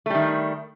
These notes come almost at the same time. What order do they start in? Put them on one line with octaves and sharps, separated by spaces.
A3 G3 D#3